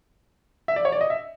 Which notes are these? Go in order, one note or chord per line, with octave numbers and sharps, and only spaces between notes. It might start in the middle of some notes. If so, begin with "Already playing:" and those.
E5
D5
C#5
D5
D#5
E5